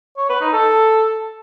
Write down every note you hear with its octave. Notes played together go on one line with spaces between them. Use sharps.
C#5
B4
D#4
A4